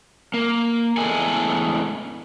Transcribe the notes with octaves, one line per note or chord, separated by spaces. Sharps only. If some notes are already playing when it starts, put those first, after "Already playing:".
A#3
E2 A2 G#3 A4 G#5